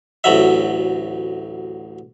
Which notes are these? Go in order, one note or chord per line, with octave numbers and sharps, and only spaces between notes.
A1 D2 F#3 E5